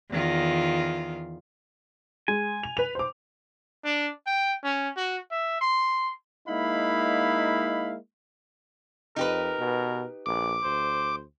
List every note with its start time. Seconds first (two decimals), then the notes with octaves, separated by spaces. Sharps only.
0.11 E2 D#3 F4
2.28 G#3 G#5
2.63 F7
2.77 B4 F7
2.95 C5 D6
3.84 D4
4.26 G5
4.63 C#4
4.96 F#4
5.31 E5
5.61 C6
6.48 G#3 A#3 D#4 E4 F5 B5
9.16 F2 D#4 G4 A#4 B4
9.59 B2
10.26 A#1 D6
10.63 D2 C5